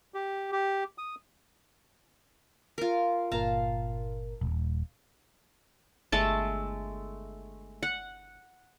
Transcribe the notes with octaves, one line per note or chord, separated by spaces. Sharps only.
G4
G4
D#6
F4 A#4
G1 A#2 A#4 F5 A5 A#5
D#1
G1 G#3 A3 A5
F#5